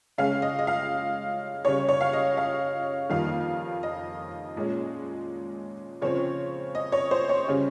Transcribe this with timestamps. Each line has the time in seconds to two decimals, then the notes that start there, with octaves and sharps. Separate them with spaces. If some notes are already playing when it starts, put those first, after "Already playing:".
0.18 C#3 G#3 C#4 F5
0.42 D#5
0.59 D#5
0.67 F5
1.65 C#3 G3 C#4 C#5
1.88 C#5
2.01 F5
2.13 D#5
2.37 F5
3.10 F2 D#3 G3 A#3 F5
3.83 D#5
4.56 A#2 G#3 C#4
6.01 C#3 F3 C4 C#5
6.75 D#5
6.92 C#5
7.11 C5
7.29 C#5
7.47 C#3 G3 C#4